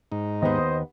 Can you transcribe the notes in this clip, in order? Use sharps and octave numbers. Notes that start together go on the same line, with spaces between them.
G#2 D#4
D#2 B3 C5 D#5